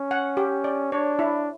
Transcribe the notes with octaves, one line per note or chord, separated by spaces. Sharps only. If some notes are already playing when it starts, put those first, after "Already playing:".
Already playing: C#4
F#5
G4
D5
D4 C#5
E4